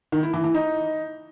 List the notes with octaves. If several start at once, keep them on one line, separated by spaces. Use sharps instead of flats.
D#3
E4
E3
E3
D#4